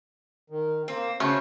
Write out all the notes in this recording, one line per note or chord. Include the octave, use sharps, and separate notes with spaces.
D#3
A#3 C4
C#3 A3 C#4 F#4 C5 C#5